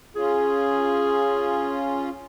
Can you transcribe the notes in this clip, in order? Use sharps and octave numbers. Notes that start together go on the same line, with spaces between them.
C#4 F4 G#4